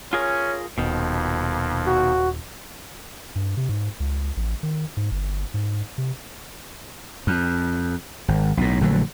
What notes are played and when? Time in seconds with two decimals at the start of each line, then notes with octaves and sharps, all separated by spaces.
0.13 C#4 F4 G#4 A#4
0.78 D#1 F2 B2 D#3
1.87 F#4
3.36 G2
3.57 C3
3.69 G#2
4.00 C#2
4.37 A1
4.63 D#3
4.97 G#2
5.11 G1
5.54 G#2
5.98 C3
7.27 F2
8.28 G#1
8.57 B1 A2
8.81 A#1 D3 F#3 A3